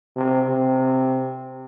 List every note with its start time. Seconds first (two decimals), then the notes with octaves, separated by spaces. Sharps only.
0.16 C3
0.50 C3